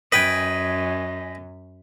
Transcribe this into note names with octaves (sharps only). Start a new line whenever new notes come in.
F#2 B4 D#5 G5 G#5